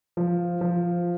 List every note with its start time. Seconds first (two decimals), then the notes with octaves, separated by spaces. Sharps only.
0.17 F3
0.61 F3